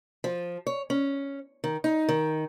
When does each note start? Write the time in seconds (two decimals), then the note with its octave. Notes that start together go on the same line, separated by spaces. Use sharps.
0.24 F3
0.67 C#5
0.90 C#4
1.64 D#3
1.84 D#4
2.09 D#3